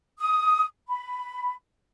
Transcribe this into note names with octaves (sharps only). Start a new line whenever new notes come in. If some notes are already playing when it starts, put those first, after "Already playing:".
D#6
B5